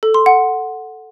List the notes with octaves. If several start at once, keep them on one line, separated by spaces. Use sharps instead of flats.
A4
C6
F#5